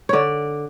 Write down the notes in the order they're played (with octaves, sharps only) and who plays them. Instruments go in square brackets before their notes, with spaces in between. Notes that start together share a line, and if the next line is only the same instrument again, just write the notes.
[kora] D3 C#5 D5